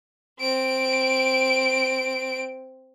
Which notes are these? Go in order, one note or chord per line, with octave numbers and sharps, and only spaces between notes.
C4 D7